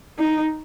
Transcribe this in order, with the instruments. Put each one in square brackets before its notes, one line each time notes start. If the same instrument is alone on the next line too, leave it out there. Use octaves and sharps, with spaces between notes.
[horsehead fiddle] D#4